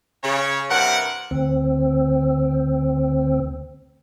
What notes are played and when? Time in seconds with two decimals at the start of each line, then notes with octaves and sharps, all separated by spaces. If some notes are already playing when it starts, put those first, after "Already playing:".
0.24 C#3 C#5
0.70 G2 C3 A#4 F#5
1.31 D2 C4